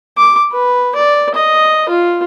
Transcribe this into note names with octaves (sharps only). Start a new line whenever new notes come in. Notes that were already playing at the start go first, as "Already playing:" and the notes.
D6
B4
D5
D#5
F4